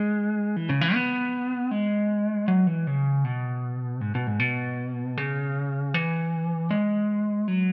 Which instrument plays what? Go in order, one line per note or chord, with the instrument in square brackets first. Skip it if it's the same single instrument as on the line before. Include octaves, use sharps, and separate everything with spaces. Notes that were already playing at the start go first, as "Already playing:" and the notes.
Already playing: [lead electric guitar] G#3
E3
C#3
E3
B3
G#3
F#3
E3
C#3
B2
G#2
B2
G#2
B2
C#3
E3
G#3
F#3